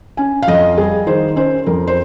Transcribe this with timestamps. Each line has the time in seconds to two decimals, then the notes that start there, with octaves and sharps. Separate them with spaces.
0.17 C#4 G#5
0.42 F5
0.47 F2 D#5
0.78 G3 G#4
1.07 D#3 C5
1.36 C#4 C5
1.66 F2 A#4
1.87 C5